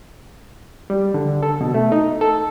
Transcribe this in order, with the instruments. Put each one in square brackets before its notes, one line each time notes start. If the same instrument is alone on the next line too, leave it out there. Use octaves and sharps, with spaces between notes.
[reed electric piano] G3
D3
A4
B2
A3
D#4
A4